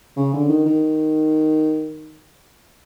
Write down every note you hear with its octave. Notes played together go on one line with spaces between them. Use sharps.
C#3
D3
D#3
D#3